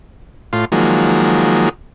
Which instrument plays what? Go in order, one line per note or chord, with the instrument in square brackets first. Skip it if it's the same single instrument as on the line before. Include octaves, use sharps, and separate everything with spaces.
[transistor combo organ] A2 F4 C6
D#3 F3 F#3 G#3 A#3